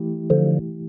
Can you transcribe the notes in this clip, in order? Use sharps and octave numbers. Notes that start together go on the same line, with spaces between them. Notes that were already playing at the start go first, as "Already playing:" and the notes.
Already playing: E3 A3 E4 G4
D3 F3